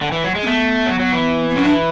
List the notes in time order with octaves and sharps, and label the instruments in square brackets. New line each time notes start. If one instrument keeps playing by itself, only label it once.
[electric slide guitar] D3
E3
F#3
G#3
[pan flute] C#4
[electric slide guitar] A3 [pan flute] B3
[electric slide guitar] F#3
F#3
E3
[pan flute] B3
[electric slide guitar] F#3 [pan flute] C#4
[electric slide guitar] E3 [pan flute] D4